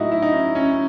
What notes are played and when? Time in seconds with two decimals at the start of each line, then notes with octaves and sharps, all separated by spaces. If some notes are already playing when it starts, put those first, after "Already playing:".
Already playing: A2 F#3 D#4 E4 F#4
0.12 E4
0.22 D#4
0.33 C#4
0.55 C#4